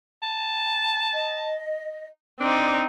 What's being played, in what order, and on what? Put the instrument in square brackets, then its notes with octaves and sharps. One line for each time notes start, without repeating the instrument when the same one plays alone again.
[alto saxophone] A5
[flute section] D#5
[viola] C4 D#4 [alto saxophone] D4 [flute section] C5 D5 D6